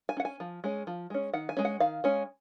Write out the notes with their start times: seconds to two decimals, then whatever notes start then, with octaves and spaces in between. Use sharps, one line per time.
0.09 G#5
0.17 C#4 F#5
0.25 G#5
0.40 F3
0.64 G#3 C#4
0.87 F3
1.10 G#3 C#4
1.34 D#3 F#5
1.49 G#5
1.57 G#3 C#4
1.65 F#5
1.80 D#3 F5
2.04 G#3 C#4